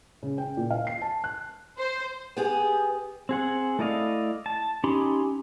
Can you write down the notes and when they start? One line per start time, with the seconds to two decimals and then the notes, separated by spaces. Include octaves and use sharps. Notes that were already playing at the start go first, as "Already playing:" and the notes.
0.23 C#3
0.38 G5
0.57 A#2
0.71 F5
0.87 C7
1.02 A5
1.24 F#6
1.78 C5
2.37 B3 G4 G#4
3.29 C4 G#4 F#5
3.79 A3 E4 D5 D#5 F5
4.46 A5
4.84 C#4 D#4 G4 B5 C6